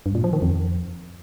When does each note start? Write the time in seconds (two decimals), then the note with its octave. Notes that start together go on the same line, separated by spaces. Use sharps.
0.06 G2
0.15 A#2
0.24 F3
0.33 D#3
0.42 F2